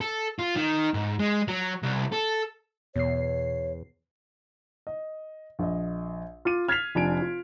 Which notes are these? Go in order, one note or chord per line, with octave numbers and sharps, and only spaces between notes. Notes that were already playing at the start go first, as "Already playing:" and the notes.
A4
F4
D#3
G#2
G#3
F#3
C2
A4
E2 B2 C#5 C7
D#5
A#1 D#5
F4 D6 D#7
F6 G#6 A6 B6 C7 F7
F1 D4 F4 G#5 D7
F4